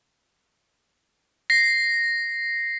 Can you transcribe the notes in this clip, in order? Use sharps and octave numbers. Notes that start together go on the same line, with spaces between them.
A#6 C7